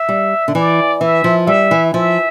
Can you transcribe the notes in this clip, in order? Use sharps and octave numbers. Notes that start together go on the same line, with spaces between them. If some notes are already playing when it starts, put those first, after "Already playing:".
Already playing: E5
G3
D3
E3 D5
E3 E5
F3
G3 E5
E3
F3 E5